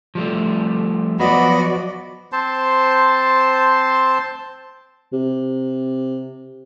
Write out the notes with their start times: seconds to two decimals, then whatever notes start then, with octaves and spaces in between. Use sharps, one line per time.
0.15 F3 G3 A3
1.20 F3 F#3 B3 F#4 D5 D#5 B5
2.32 C4 C5 A5 C6
5.13 C3